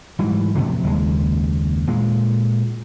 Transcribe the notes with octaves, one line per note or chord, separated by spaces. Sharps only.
G#2 E3 F#3 G3
A2 C3 F3 F#3
F#1 D#2 G#3
A#2 G#3